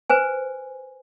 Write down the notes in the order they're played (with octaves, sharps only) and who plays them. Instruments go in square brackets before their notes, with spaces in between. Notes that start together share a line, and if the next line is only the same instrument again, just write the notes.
[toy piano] B4 C5 G#5